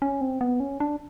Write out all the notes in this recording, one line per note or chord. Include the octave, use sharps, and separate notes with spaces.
C#4
C4
B3
C#4
D4